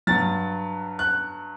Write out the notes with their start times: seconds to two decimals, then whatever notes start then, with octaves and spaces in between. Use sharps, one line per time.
0.07 G2 F#3 A6
0.99 F#6